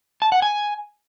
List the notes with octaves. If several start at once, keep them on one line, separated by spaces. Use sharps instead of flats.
A5
F#5
G#5